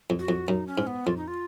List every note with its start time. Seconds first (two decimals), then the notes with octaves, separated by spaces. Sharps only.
0.10 F2
0.19 F#4
0.29 F2
0.48 F#2 D#4
0.67 C#4
0.78 G#2
0.87 B3
1.06 F2 F4
1.17 D#4
1.28 F4